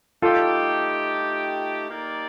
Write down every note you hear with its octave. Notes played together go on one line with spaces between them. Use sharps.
A3 D#4 F4 G4 A4
A#3 D#4 G4 A#4 D5